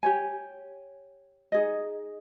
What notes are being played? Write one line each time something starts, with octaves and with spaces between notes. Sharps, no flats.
G4 C#5 G#5
D#4 G#4 D#5